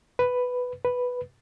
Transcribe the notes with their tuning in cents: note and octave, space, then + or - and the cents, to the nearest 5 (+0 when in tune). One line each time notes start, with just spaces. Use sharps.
B4 +5
B4 +0